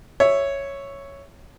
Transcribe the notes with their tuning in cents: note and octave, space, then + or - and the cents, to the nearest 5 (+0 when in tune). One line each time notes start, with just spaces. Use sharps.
C#5 +0 E5 +0